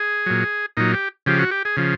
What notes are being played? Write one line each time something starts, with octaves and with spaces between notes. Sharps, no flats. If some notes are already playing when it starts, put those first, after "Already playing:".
Already playing: G#4
A#2 F#3
A#2 F#3 D#4
G4
C#3 F3 G4
F#4
G4
G#4
C#3 F3